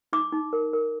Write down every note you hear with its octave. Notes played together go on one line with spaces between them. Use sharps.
D#4 D6
D#4
A#4
A#4